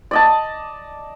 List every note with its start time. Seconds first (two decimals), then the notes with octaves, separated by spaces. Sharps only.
0.11 D5 D#5 A5